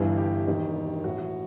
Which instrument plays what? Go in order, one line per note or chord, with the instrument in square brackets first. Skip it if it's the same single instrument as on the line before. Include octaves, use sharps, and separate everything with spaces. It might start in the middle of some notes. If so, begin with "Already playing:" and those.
Already playing: [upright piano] G1 G2 E3
G4
E1 D#2 D#3
A1 A2 E3 F#4
F#4